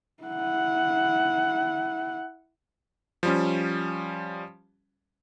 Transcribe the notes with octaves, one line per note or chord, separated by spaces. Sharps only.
E4 F#5
F3 G3 C#4